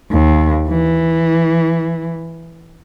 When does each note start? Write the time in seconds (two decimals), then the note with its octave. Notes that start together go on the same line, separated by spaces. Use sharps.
0.12 D#2
0.69 E3